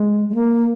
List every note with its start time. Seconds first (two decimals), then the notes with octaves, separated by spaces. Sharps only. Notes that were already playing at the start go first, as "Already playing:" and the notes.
Already playing: G#3
0.29 G#3
0.35 A#3